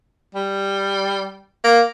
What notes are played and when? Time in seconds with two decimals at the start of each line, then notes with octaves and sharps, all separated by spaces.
0.35 G3
1.64 A#3